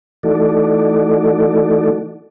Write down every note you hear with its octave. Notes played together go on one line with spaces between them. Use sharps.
E3 A3 D#4 F#4 A4 D5